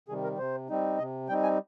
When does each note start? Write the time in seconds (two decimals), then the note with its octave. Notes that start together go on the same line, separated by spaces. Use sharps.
0.09 C3 D#3 G3 G#4
0.24 A#4
0.38 C3 C5
0.69 G3 C4 D#4
0.98 C3 D#5
1.29 G3 C4 D#4 G5
1.43 G#5